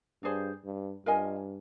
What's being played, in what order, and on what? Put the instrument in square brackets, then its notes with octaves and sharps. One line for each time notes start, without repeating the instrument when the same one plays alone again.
[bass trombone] G2 [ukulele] D4 G#4 C5
[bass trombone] G2
[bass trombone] G2 [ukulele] F4 A#4 D#5 G#5